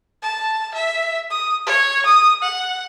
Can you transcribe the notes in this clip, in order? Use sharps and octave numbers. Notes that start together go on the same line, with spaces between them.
A5
E5
D#6
C#5
D#6
F#5